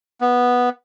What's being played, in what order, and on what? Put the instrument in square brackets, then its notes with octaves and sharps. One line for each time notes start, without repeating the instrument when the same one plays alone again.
[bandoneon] B3